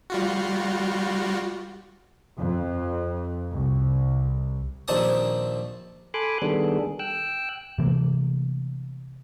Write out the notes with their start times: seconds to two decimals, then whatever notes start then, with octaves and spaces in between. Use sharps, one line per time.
0.10 G3 F4 F#4
2.38 F2
3.51 C2
4.88 A#1 D#2 C4 D4 A5 D#6
6.14 A4 G#5 B5 C6 D6 F#6
6.42 D#3 G3 B3 D4 G#4 A4
6.99 G5 E6 F#6
7.78 C3 E3 A3 A#3